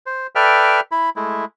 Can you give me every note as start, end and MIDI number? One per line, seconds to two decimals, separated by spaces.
0.06 0.27 72
0.35 0.80 69
0.35 0.80 71
0.35 0.80 74
0.35 0.80 76
0.35 0.80 79
0.35 0.80 89
0.92 1.10 64
0.92 1.10 83
1.16 1.45 56
1.16 1.45 57
1.16 1.45 64